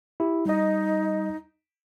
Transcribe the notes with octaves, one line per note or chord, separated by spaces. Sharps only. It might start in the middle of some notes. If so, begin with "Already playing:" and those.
E4 G4
G3 D#4 D#5